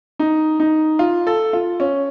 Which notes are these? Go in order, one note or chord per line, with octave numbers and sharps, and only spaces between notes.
D#4
D#4
F4
A4
F4
C#4